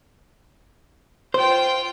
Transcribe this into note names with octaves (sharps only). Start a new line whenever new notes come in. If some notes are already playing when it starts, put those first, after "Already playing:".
F4 C5 G5